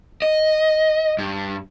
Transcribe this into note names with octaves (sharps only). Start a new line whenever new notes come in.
D#5
G2